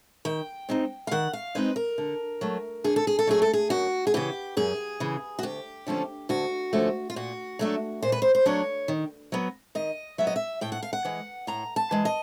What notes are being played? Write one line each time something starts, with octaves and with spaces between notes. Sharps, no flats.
D#3 G5
G#3 C4 D#4
F5
D#3 F#5
F5
G#3 C4 D#4 B4
A#4
D3
F#3 A3
D3 G#4
A4
G#4
A4
F#3 A3 G#4
A4
G#4
F#2 F#4
G#4
C#3 E3 G4
F#2 G#4
C#3 E3
F#4
D2 G4
D3 F3 A3 C#4
D2 F#4
D3 F3 A3 C#4
F4
A#2 F#4
F#3 A3 D4
A#2 C5
B4
C5
C5
F#3 A3 D4 C#5
D#3
F#3 B3
D#3 D#5
F#3 B3 E5
D#5
E5
A2 G5
F#5
F5
F#5
E3 G#3
A2 A#5
A5
E3 G#3
D#5